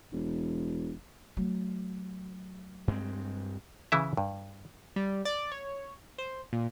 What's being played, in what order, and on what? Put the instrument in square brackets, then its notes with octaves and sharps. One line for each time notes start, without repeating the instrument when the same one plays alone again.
[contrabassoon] E1
[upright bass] F#3 A3
[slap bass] G2 G#3 C4
[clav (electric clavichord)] C#3 E3 E4 E5
G2
[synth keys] G3
D5
C#5
C5
A#2